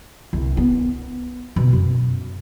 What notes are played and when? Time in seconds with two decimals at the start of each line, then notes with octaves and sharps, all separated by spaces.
0.33 C2
0.57 B3
1.56 B2
1.73 F#2